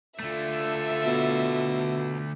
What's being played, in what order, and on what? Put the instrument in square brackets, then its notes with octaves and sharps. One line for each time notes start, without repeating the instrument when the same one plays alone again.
[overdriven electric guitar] D3 A3 [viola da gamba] F4 A4 [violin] E5
[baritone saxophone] B2